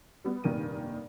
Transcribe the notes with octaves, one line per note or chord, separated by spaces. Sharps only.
G3 B3
F1 G2 A#2 D#3 A#4 D#7